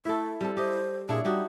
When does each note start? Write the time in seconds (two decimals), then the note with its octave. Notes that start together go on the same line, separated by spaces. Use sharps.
0.05 A3 E4 A4 E5
0.41 G3 C4 A4
0.57 G4 C5 D#5
1.09 A#2 D4 E4 G#4 C#5
1.25 G3 D#4 F#4 G4